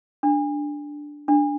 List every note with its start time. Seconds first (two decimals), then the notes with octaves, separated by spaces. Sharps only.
0.23 D4
1.28 D4